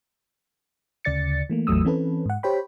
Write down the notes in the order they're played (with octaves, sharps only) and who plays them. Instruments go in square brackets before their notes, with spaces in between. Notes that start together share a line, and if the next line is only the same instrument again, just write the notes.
[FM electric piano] D2 C#3 D5 A6 C#7
E3 A3 A#3
A1 E2 F#3 A3 D#6 E6
E3 C4 C#4 A4 B4
G#2 F#5
G4 C5 C#5 G5 B5